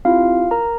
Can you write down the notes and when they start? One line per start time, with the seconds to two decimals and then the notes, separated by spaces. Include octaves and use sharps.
0.05 C4 E4 F4 G4 F5
0.51 A#4 A#5